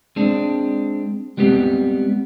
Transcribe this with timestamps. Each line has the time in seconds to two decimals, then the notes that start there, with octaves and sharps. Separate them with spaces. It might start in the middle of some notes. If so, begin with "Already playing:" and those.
0.16 G#3 C4 D4
1.37 G3 G#3 B3 C4 G4